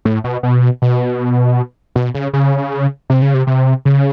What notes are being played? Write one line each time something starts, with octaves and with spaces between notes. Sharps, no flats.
A2
B2
B2
B2
B2
C#3
C#3
C3
C#3
C3
C3
C#3